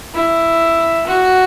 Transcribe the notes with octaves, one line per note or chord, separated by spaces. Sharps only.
E4
F#4